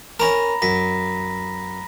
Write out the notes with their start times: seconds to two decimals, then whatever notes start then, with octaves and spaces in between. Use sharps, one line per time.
0.20 C#4 A#4 A#5 B5 A#6
0.62 F#2 A#6 B6